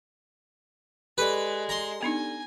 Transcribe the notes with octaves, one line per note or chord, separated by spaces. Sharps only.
G#3 G4 A4 B4 D5
A#5 C6
B3 D4 D#4 G#5